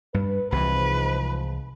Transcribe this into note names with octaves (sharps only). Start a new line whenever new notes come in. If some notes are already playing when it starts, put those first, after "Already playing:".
G2 B4
C2 G#2 C3 E3 F3 B4